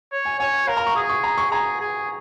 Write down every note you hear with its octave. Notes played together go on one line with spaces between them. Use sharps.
C#5
G#5
C#5 G#5
A#4 F5
A#5
C#6
G#4 D#6
C#6
A#5
C#6
G#4 A#5
G#4